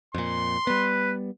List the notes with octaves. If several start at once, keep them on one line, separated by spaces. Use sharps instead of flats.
F2 A#2 C6
G3 B3 B4